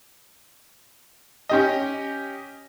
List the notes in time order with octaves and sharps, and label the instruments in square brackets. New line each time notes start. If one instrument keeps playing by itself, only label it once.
[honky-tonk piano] C#4 G4 D#5